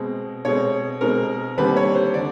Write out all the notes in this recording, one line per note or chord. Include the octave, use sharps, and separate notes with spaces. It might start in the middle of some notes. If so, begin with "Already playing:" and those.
Already playing: B2 G#3 C4
B2 G#3 C4 C#5
B2 G#3 C4 A#4
D#2 D3 G3 C4 B4
C#5
C5
D3 D5